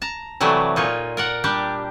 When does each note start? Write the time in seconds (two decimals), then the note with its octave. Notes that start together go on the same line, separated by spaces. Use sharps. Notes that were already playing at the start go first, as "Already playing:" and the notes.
0.02 A5 A#5
0.40 C3 E3 F#3 G3 A3
0.76 A#2 D#4 F4 C#5
1.17 A#4 D5 F#5
1.44 G3 D4 G4